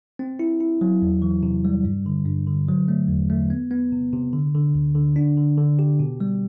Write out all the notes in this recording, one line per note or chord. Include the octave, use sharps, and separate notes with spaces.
C4
E4
E4
F#3
E2
E3
C3
G3
G2
D3
G2
D3
F#3
A3
E2
A3
B3
B3
C3
C3
D3
D3
D2
D3
D4
D3
D3
G4
B2
G3